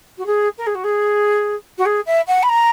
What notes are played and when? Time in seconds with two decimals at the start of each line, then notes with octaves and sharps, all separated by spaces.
0.17 F#4
0.26 G#4
0.57 A#4
0.66 G#4
0.74 F#4
0.84 G#4
1.78 F#4
1.85 G#4
2.06 E5
2.27 F#5
2.42 B5
2.49 A#5